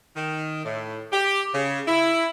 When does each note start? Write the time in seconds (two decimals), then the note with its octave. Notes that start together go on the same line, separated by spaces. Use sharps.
0.16 D#3
0.65 A2
1.13 G4
1.54 C#3
1.87 E4